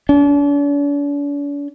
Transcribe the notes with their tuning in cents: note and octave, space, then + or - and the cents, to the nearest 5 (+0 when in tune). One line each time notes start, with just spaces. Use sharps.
D4 -45